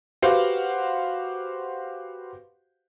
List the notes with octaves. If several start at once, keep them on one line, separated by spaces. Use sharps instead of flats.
F#4 G4 B4 C5 F5 F#5